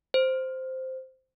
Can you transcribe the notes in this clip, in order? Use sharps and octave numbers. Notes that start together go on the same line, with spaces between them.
C5